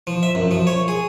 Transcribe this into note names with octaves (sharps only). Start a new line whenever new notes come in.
F3
E5
F#2
F3
C#5
G#4